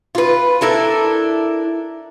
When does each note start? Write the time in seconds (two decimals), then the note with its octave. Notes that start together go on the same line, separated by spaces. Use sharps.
0.15 F4 B4
0.61 D4 E4 A4 A#4